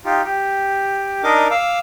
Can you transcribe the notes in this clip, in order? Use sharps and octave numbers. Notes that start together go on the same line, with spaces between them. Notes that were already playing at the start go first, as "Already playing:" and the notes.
D#4 F4 G4
G4
D4 D#4 A#4 D#5 D6
F5 D6 E6